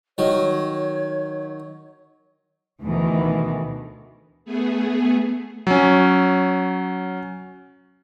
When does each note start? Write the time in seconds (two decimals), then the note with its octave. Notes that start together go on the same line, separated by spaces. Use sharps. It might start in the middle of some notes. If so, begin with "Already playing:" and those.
0.18 D#3 F#3 C#5
2.82 D2 B2 D#3 E3
4.45 A3 B3 G#4
5.67 F#3 C#4